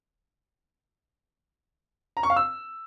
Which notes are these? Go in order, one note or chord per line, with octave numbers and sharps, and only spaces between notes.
A#5
C#6
F5
E6